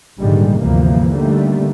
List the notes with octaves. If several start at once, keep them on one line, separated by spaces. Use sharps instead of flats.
A#1 G#2 D3 D#3 G3 G#3
D2 G2 C3 E3 F3 A#3
D3 D#3 G3 A3 A#3